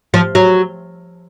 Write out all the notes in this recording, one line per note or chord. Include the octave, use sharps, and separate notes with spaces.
F3
F#3